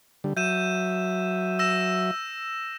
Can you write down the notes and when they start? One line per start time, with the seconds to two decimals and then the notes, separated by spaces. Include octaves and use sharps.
0.24 D3 G3
0.37 F#3 E5 G6 D#7 E7
1.59 E6 A#6 E7